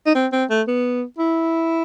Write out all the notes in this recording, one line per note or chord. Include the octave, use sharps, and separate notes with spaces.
D#4
C4
C4
A3
B3
E4